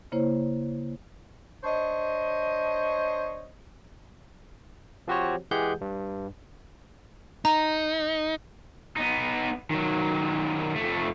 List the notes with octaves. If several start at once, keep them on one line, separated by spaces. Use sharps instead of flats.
C#3 A#3 E4 C5 C#5
D4 C5 C#5 D#5
F3 C4 F#4 G4 C5 C#5
E3 G#3 G4 G#4 F#5 G6
G2
D#4 A#5
B3 D#4
D#3 F#3
F2 A3